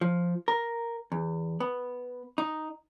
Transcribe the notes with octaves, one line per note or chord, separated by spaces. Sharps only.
F3
A#4
E2
B3
D#4